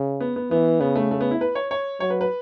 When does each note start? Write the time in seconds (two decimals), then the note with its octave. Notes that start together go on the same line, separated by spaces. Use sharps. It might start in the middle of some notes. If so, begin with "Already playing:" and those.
Already playing: C#3
0.20 B3
0.36 B3
0.51 E3 B3
0.81 C#3 B3
0.96 A3
1.11 A3
1.21 B3
1.31 E4
1.41 B4
1.55 C#5
1.71 C#5
2.00 F#3 C#5
2.10 B4
2.21 B4